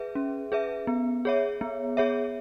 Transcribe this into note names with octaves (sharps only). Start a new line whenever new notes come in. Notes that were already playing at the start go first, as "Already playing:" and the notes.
Already playing: G#4 B4 E5
C#4
G#4 B4 E5
B3
G#4 C#5 E5
B3
G#4 C#5 E5